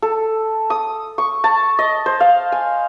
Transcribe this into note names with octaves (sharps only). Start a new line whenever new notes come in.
A4
D#6
C#6
A5
D#5
C5
F5
G#5